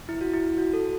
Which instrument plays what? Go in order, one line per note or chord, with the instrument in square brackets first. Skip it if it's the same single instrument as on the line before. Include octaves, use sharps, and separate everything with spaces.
[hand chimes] E4
F#4
E4
F#4
A4